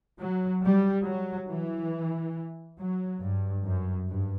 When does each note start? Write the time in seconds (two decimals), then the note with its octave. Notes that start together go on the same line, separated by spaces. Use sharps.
0.20 F#3
0.62 G3
1.06 F#3
1.49 E3
2.79 F#3
3.21 G2
3.65 F#2
4.09 G2